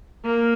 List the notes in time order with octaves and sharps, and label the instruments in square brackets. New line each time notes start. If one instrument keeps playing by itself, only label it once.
[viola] A#3